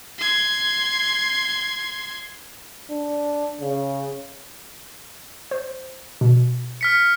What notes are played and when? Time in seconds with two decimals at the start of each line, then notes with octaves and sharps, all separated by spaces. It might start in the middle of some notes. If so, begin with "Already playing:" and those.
0.18 C6 G#6
2.90 D4
3.61 C#3
5.51 C5
6.21 B2
6.81 F6 B6 C#7